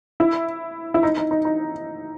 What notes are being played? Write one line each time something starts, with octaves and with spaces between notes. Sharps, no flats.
E4
E4
D#4
D#4
D#4
D#4